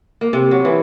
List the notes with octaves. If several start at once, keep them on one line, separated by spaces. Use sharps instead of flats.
A#3
C3
F#3
E3